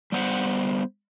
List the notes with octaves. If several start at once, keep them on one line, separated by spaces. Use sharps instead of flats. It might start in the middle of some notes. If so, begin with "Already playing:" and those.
G3 B3 C5 F#5